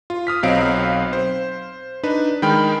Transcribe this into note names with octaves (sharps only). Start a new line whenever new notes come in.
F4
D#6 F6 B6
B1 F#3 C4 D#5 F5 D7
C5
D4 D#4 B4
D#3 G#3 G5 B5 F6